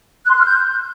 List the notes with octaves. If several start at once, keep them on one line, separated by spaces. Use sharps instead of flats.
F#6
C6
F#6
F6
G6